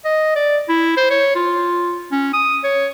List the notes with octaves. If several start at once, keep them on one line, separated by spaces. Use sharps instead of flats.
D#5
D5
E4
C5
C#5
F4
C#4
D#6
C#5